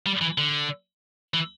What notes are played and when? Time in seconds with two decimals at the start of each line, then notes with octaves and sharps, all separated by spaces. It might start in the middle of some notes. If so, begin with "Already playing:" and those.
0.06 G3
0.21 E3
0.38 D3
1.34 E3